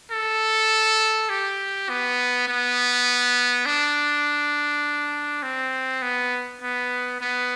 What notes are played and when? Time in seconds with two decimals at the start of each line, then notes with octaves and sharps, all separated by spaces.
0.11 A4
1.30 G4
1.89 B3
2.48 B3
3.66 D4
5.43 C4
6.02 B3
6.62 B3
7.21 B3